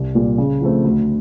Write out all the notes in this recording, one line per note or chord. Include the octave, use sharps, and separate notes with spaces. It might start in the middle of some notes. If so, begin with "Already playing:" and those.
Already playing: C2
A#2 G3
C#3
F3 A3 C4
D2